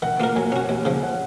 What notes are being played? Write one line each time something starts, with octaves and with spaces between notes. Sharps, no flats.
D#3 F#5
A#3 F4 A#4
F#3 G#5
C#4 F#4
D#2
C#3 F3
F#5